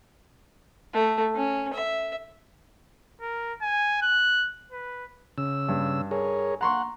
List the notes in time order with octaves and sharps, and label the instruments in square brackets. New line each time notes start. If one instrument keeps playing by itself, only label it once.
[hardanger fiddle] A3
C#4
E5
[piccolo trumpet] A#4
G#5
F#6
B4
[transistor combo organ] C#3 E6
[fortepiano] G2
[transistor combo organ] G#4 A#4 C#5
[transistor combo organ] F#5 [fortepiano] A#5 C6 C#6